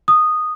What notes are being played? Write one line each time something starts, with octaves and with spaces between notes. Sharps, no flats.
D#6